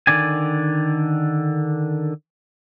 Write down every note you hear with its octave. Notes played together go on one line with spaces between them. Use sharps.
D3 D#3 D5 G#5